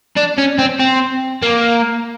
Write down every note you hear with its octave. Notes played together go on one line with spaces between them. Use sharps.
D4
C#4
C4
C4
A#3